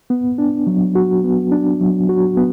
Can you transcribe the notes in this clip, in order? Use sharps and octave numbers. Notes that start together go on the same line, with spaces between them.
B3
D4
F#3
F#4
B3
D4
F#3
F#4
B3